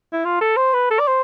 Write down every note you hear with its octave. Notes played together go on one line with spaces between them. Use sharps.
E4
F4
A4
C5
B4
A4
D5
C5